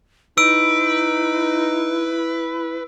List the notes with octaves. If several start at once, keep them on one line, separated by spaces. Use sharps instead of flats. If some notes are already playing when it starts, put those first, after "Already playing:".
D#4 E4 B4 E6 D7